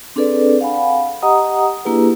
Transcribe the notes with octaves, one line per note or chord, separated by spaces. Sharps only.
C4 D4 G#4 A4 B4 D5
F5 F#5 G#5 B5
G4 D#5 F#5 A#5 D#6
A#3 D4 E4 G4 G#4 B4